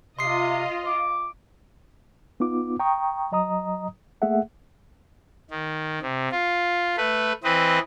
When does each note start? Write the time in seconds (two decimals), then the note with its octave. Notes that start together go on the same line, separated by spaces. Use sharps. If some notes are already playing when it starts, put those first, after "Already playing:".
0.19 C3 F4 D#5 C6 D#6 C7
0.87 D6
2.40 B3 D#4 F4 D6
2.80 G5 A#5 C#6 D#6
3.32 F#3 D#5 A#5 D#6
4.22 A3 A#3 G#4 E5 F#5
5.50 D#3
6.02 C3
6.31 F4
6.97 A3 B4
7.44 E3 C4 B4 D#5